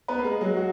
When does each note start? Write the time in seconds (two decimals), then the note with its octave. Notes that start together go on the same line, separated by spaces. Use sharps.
0.08 B3 B4
0.18 A#3
0.24 G#3 G#4
0.41 F#3 G#3 G#4
0.57 F#4